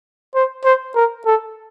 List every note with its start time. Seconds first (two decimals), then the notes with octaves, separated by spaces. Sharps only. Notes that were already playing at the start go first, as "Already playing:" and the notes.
0.35 C5
0.64 C5
0.95 A#4
1.26 A4